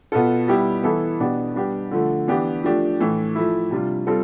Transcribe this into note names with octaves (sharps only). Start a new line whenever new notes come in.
B2 B3 F4 A4
G3 B3 E4 G4
E3 B3 E4 A4
B2 B3 D4 G4
G3 B3 D4 G4
D3 F3 A3
E3 B3 D4 G4
F3 A3 D4 G4
A2 E3 A3
F3 A3 E4
C3 G3 D4 F4
G3 C4 F4 A4